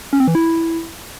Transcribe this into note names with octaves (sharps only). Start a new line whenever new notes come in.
C#4
C4
E3
E4